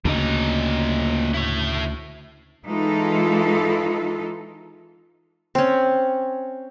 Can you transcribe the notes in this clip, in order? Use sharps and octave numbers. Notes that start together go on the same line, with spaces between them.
D2 A#2 C#3 D#4
E4 C#5
E3 G#3 D#4 F4 A4
C4 C#4